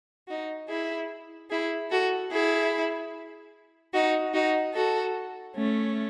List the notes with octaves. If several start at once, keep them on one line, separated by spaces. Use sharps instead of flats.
D#4 F#4
E4 G#4
E4 G#4
F#4 A4
E4 G#4
D#4 F#4
D#4 F#4
F#4 A4
A3 C#4